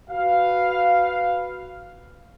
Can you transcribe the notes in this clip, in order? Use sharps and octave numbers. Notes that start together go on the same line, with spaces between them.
F#4 B4 F5